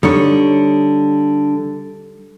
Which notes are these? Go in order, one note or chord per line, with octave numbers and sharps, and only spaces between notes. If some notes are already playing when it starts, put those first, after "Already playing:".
D3 G3 D#4 C#5